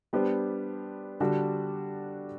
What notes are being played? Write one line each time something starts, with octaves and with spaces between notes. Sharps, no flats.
G3 B3 D4 G4 C5
D3 G3 D4 F#4 A4